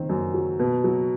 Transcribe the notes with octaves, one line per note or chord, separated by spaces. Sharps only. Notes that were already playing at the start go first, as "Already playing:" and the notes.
Already playing: D#3 C4
F#2
F#3
B2
F#3